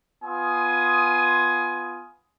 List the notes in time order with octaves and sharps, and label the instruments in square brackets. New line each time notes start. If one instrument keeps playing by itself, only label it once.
[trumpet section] B3 F4 G#5 C6 D#6